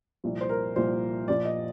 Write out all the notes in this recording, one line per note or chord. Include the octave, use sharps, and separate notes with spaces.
C2 A#2 F3
C5
A#4
C2 A#2 F3 C5
A#1 A#2 F3 D5
D#5